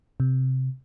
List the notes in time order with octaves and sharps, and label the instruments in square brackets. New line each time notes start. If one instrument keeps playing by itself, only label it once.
[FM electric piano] C3